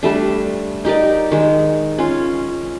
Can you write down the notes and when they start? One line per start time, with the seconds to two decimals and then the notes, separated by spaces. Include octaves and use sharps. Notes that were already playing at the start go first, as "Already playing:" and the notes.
0.03 G3 A3 D4
0.85 D#4 G4 A#4 D5
1.31 D#3 G#3
1.98 C#4 F4